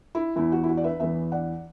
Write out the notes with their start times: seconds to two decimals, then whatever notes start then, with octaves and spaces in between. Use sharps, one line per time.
0.15 E4
0.36 E2 E3 E4
0.52 F#4
0.63 E4
0.69 F#4
0.77 D5
0.84 B4 E5
1.00 E2 E3 B4 E5
1.32 D5 F#5